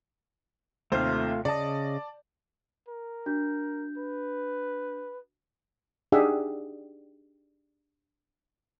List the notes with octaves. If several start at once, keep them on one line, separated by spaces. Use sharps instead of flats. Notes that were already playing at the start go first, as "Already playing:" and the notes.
D#2 C3 A3 F4 C5 F5
C#3 D5 D#5 A5
A#4
D4 F#4 G6
B4
D4 D#4 G4 G#4 E5 F#5